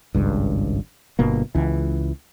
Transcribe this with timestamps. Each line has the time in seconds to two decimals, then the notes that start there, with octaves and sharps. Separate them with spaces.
0.15 G#1 C#2 G2
1.19 G1 B2 A#3
1.55 C#2 E3